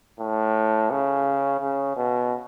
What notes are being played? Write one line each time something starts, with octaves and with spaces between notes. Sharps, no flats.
A2
C#3
C#3
B2